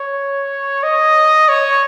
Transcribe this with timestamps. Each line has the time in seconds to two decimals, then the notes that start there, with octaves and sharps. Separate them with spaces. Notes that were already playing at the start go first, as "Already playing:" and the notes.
Already playing: C#5
0.83 D#5
1.49 C#5